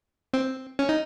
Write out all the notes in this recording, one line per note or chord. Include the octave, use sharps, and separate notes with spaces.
C4
C#4
D#4